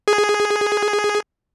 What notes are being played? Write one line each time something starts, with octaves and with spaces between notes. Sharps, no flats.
G#4